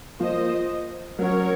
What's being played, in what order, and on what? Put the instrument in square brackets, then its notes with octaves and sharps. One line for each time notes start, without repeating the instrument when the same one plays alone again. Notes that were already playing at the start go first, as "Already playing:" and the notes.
[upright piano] F3 A#3 F4 [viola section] C5 D#5
[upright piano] F#3 C#4 F#4 [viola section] A#4 C#5